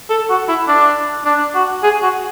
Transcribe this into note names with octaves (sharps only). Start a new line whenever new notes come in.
A4
F#4
E4
D4
D4
F#4
G#4
F#4